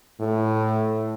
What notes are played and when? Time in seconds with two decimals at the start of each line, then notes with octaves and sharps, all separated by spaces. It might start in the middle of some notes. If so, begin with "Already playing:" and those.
0.20 A2